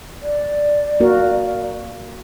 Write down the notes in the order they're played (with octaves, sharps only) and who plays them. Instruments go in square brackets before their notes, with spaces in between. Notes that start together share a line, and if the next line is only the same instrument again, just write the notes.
[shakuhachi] D5
[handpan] A#3 F#4 A#4